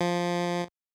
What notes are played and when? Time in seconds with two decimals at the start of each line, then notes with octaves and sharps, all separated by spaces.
0.01 F3